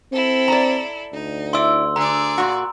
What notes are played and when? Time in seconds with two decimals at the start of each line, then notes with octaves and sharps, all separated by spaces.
0.12 C4 E4 A4
0.48 D5 A#5
1.12 D2 D#4
1.53 E4 D5 C6 E6
1.96 D3 G#4 D5 A#5
2.38 A#2 F#4